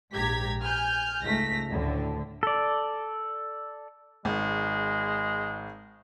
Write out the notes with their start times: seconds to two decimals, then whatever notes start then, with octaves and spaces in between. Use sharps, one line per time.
0.13 A#1 G#2 G4 A#5 G#6 B6
0.61 G#5 F6 G6
1.23 C#2 G#2 A3 A#6 B6
1.69 D2 A2 D3
2.43 A4 D5
4.25 G#1 G#3